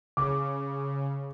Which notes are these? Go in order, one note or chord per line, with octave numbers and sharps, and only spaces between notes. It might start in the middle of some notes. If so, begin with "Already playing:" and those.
C#3 D6